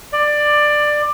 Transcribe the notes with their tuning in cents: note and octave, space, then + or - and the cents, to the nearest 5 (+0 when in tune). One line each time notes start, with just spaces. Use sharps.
D5 +15